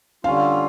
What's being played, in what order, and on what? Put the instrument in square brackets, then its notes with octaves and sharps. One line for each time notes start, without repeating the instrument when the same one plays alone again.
[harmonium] D3 G3 C#4 F4 [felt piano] F5